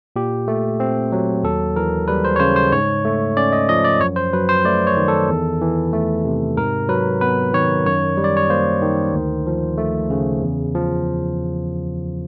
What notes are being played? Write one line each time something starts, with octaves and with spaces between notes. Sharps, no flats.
A#2 G4
A3
C4
F#3
D#2 A4
E3 A#4
G3 B4
C5
C#5
C#3 C5
C5
G#2 C#5
A3
C#4 D5
D#5
F3 D#5
D5
F#2 C#5
C5
F#3 B4
C5
A3 D5
C#5
D#3
A4
E2
E3
A3
C3
G#2 A#4
F#3 B4
B3 B4
D#3 C#5
F#2 C#5
G3
D5
C#5
A#3 C5
D#3
D2
F3
A3
C#3
E2
F3